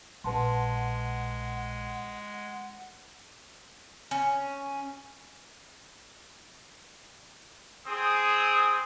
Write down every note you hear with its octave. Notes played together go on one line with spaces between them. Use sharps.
A#1 G#3 B4 F#5 A5 C6
C#4
C4 G#4 D#6